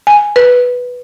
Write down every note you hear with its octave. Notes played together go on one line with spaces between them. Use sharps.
G#5
B4